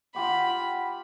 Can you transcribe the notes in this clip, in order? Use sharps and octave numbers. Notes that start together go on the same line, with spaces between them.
F4 G4 F#5 B5